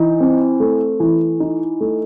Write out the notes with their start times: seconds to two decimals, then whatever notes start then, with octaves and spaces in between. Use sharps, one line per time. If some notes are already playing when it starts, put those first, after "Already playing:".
Already playing: E3 D#4
0.20 C4
0.60 A3
1.00 E3
1.40 D#4
1.80 A3